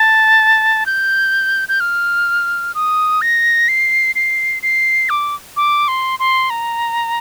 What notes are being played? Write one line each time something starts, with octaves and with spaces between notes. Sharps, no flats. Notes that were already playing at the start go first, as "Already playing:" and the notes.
Already playing: A5
G6
G6
F6
D#6
A#6
C7
C7
C7
D6
D6
C6
C6
A#5